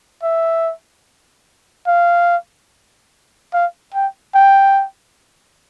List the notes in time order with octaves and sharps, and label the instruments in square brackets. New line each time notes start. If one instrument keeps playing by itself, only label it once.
[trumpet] E5
F5
F5
G5
G5